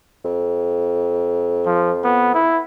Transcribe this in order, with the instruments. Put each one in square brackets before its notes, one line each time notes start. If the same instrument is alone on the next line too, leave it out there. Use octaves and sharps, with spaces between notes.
[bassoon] F2
[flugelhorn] F3
B3
E4